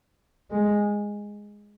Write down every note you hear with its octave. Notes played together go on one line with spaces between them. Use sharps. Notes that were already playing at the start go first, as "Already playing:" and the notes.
G#3